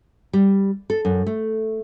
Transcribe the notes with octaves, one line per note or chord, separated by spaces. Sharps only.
G3
A4
F#2
A3